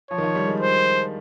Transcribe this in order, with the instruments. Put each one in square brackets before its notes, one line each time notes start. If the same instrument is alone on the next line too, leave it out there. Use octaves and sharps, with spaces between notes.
[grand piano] F3 [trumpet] C#5
[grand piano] D#3
F3
G3
G#3
[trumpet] C5